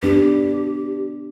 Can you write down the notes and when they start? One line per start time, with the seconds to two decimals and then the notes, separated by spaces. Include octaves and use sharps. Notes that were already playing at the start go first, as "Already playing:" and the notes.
0.03 B3 D4 G4 B4